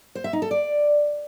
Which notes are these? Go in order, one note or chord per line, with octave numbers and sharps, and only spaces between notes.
C5
E5
D#4
A4
D5